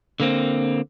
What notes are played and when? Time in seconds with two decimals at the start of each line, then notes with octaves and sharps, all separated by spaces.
0.20 D3 A#3 C4